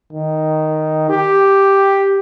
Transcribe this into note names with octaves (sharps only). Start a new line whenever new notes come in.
D#3
G4